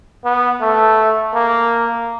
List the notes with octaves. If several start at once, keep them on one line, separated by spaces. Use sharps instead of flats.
B3
A3
A#3